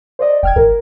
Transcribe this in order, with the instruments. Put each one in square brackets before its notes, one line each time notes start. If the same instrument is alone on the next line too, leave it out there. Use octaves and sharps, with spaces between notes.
[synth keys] C5 D5 D#5
[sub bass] E1 [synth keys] G5 F6 G#6
[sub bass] G#1 [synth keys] A#4